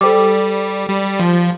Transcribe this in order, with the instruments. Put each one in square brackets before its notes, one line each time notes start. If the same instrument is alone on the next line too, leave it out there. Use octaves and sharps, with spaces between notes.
[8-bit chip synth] G3 [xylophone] A4 C5 G5 D6
[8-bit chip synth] G3
F3